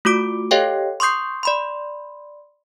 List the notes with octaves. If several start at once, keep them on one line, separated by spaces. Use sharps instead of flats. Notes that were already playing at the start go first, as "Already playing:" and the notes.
A3 F4 F#4 D6 D7
G4 A4 C#5 D#5 F5 G5
C6 C#6 D#6 G6 C7
D5 B5 C6